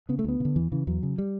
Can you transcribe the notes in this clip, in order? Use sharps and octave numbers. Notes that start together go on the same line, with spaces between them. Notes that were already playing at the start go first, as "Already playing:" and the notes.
C#3 B3
A3
D2 B3
C#3
D3
E2 E3
C#3 E3
E2 F#3
C#3
G3